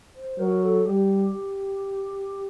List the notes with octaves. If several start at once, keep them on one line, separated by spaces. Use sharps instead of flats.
C5
F#3 A#4
A4
G3 G4